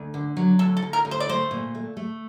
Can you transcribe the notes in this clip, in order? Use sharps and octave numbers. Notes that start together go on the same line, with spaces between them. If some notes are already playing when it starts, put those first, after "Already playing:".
Already playing: D2
D3
F#3
D2 A4
A4
D2
A#4
D2
C5
D5
A3 C5
A#2
A3
A3